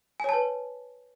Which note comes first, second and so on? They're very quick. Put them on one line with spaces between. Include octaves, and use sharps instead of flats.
G#5 C#5 A5 B4